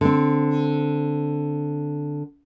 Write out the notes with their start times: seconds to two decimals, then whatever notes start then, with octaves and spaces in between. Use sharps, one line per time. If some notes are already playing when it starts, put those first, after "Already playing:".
0.01 D3 C4